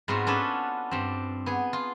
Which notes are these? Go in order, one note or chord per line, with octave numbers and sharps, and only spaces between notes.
G#2 B3 C4 F4 F#4
C#4 D4 A4 B4
G2 C4
B3 G#4
F4